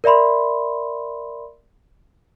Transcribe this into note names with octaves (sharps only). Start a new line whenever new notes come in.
A#4 D5 E5 B5 C6